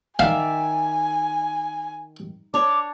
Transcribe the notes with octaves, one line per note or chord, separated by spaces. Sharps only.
D#3 D5 E5 F5 G#5
D4 C#5 D6